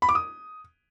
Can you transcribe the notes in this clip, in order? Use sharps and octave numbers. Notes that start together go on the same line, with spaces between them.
B5
D6
D#6